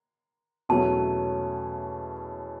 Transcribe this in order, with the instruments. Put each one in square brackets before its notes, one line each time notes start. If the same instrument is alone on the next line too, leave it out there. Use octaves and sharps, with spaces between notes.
[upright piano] E2 B2 F#3 A3 C#4 [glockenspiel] A5